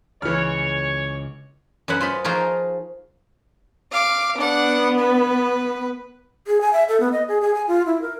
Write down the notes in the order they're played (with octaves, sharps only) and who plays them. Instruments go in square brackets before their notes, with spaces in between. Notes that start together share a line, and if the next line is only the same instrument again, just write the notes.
[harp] C#2 [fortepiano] E3 F6 [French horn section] C#5
[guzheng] F#2 F#3 B4 F#5
F4 C5 D#5 B5
F3 D#4 F4 F#4 G#4 A#4
[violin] F5 D6
[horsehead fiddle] B3 [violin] D4 F#5
[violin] B4
[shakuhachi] G#4
G#5
E5
A4
B3
D#5
G#4
G#4
G#5
F4
E4
A#4